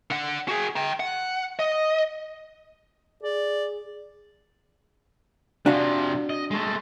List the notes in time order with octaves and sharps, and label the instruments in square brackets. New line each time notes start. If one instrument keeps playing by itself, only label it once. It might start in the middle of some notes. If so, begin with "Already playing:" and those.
[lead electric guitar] D3 F#5
F#4 G#4
G5 A#5
F#5
D#5
[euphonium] G#4 [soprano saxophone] D5
[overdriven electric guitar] C3 F3 [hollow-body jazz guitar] D4 F#4 F5
[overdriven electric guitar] D#5
G#3 A3